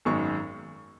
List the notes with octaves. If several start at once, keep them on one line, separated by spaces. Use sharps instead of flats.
G#1 F#2 D#3 G#3 C#6